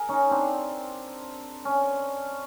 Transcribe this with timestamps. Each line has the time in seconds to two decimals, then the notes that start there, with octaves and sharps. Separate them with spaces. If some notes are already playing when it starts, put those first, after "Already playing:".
Already playing: G#4 A#4
0.09 C#4 D#4
0.31 C4 D4
1.65 C#4